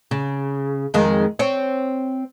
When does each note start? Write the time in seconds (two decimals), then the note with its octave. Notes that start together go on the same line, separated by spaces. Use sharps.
0.11 C#3
0.94 F2 D#3 G#3
1.39 C4 C#5